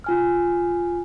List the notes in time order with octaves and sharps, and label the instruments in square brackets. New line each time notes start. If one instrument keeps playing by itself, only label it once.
[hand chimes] F4 G#5 F6